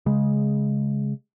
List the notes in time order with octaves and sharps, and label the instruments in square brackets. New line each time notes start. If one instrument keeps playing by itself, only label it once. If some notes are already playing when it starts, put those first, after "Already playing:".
[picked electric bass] C#3 G#3